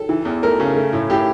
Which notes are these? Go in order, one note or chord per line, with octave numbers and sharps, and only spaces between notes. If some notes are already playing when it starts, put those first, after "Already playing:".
Already playing: A4
E3
E2
A3 A#4
C#3
A3
A2
A2 G4